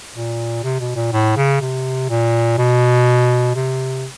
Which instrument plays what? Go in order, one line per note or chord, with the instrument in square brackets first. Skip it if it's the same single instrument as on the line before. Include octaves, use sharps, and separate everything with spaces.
[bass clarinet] A#2
C3
B2
A#2
A2
C#3
C3
A#2
B2
C3